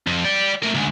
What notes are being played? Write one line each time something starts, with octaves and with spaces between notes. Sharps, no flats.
F2
D5 G5
A3 A#4
D2 G#3